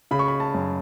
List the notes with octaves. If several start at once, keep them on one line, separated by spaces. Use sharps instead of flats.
C#3 B5
C#6
B5
A5
F#2